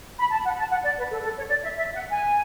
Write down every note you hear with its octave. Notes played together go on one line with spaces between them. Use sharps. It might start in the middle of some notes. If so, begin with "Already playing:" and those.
B5
A5
F#5
A5
F#5
D5
B4
A4
A4
C#5
D5
E5
E5
F#5
G#5